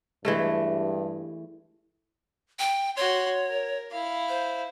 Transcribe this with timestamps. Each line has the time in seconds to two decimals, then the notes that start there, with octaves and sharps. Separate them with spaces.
0.25 G2 E3 G#3 A3
2.59 G5
2.97 F#4 C#5 C6
3.48 A#4
3.91 E4 F5
4.29 C5